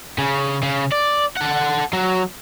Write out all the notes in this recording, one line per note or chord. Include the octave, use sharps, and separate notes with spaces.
C#3
C#3
D5
A4 F#5
F#3